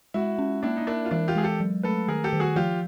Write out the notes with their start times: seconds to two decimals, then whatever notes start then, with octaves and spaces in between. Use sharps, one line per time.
0.14 G#3 E4 F#4
0.39 C#4
0.63 A#3 D4 E4
0.77 D#4
0.87 D4 E4 A#4
1.05 F4
1.11 E3 D4 E4
1.28 F4 G4
1.35 G#3 G#4
1.43 G4 A4
1.60 F#3
1.83 A3 A4 B4
2.08 D#3 G#4 A#4
2.24 G4 A4
2.33 D#3
2.40 F#4 G#4
2.56 F3 F4 G4